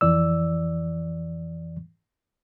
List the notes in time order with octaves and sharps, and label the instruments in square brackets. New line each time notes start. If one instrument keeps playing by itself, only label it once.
[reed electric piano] F2 E3 D5 E6